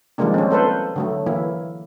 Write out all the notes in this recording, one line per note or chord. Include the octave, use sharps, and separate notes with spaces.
D#3 F3 G3 G#3 A#3 D4
C4 C#4
A#3 A4 B4 C5
D3 F#3 A3
E3 A#3 E4